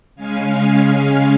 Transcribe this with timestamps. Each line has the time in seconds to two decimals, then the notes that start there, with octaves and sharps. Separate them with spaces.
0.15 C#3 G#3 C#4 F5 G#5